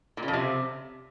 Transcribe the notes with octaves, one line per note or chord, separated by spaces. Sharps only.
A#2
C#3
F2
C3